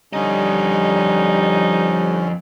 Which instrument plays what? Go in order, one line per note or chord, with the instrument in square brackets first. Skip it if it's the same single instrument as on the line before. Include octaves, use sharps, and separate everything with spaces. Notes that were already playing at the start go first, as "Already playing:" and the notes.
[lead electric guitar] F2 D#5 [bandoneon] D3 C#4 [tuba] G3 [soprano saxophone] D#4